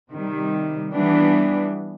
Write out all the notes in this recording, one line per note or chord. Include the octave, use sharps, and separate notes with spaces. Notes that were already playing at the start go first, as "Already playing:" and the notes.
C3 D#3 G3
E3 G3 B3 D4